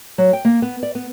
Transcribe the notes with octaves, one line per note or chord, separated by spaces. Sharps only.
F#3
G5
A#3
B3
D5
B3